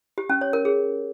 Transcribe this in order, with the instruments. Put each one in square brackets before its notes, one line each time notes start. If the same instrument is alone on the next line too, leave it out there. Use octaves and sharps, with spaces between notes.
[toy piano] G4
C#4
C#5
A#4
G#4